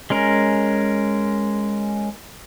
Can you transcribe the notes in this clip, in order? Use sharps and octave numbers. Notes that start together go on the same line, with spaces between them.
G#3 C#4 A#4